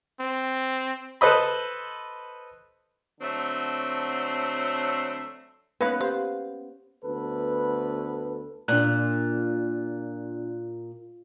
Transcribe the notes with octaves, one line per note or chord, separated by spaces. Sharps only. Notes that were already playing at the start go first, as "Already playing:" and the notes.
C4
A4 B4 C5 D#5 B5
D3 F#3 A3 C4
A#3 B3 C#4 D#4 B4 F5 G#6
G4 C5 F5
D2 B3 A4 B4
A#2 D4 F#6